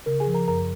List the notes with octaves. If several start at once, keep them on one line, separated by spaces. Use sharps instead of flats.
C#3 A#4
G#4 G#5
F3
A#4 A#5
F#2 A#4 A#5